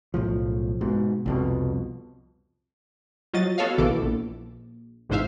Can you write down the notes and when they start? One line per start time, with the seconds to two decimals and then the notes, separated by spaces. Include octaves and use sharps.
0.14 B1 A2 F3
0.81 G#2 B2
1.26 C2 F2 B2
3.33 F3 F#3 D#5 A6
3.58 B3 F#4 A4 C#5 D#5 F5
3.78 A#1 B2 D#3 E3 A4 D6
4.02 A#1
5.09 A1 F2 G#2 C5 E5 F5